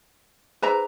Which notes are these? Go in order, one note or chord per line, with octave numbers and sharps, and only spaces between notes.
D#4 G#4 B4 C5 E5 A#5